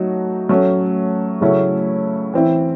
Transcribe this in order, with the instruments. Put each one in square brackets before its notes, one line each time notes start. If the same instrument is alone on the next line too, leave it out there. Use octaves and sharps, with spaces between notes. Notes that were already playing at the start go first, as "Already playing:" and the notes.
Already playing: [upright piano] F#3 A3 D#4 F#4
F#3 A3 C#4
C#3 F#3 A3 C#4 E4
E3 C4 E4